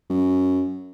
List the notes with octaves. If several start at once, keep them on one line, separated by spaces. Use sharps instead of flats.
F#2